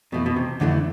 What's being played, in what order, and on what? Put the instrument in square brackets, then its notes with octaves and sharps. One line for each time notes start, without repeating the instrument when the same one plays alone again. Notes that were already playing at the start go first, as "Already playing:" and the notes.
[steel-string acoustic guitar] F2 E3 A3 E4 [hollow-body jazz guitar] B2
[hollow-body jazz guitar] B2
C3
[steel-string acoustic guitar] F2 E3 A3 E4 [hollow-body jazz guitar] D3